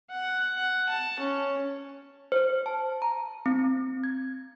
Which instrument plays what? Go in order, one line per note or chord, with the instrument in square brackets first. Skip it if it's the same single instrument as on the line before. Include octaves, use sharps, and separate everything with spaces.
[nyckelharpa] F#5
F#5
A5
C#4
[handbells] C5
A5
A#5
C4
G#6